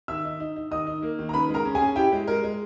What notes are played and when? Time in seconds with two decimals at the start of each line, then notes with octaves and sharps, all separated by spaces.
0.08 D#3 E5 E6
0.25 D#4
0.40 D#4
0.56 D#4
0.71 D#3 D#5 D#6
0.87 D#4
1.03 A#3
1.19 D#3
1.29 A#5
1.33 C#3 B4 B5
1.49 G#3
1.54 A#4 A#5
1.65 C#4
1.75 G#4 G#5
1.81 C#4
1.96 E4 G4 G5
2.12 G#3
2.27 G#3 A#4
2.43 G#3